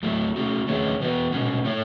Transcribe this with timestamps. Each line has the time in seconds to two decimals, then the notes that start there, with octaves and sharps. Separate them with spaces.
0.03 F#3 A3 E4
0.36 A3 C#4 F#4
0.67 D#3 A3 C#4 G#4 C#5
1.00 E3 B3 F#4 B4
1.32 B2 G#3 C#4 F#4
1.65 A3 E4 A4 C#5